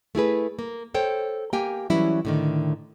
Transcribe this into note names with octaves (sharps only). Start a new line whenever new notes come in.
A3 E4 G#4 B4
A#3
A4 C5 C#5 G5
A#3 G4 G5 G#5
E3 F#3 G3 C#4 E4
A2 D3 D#3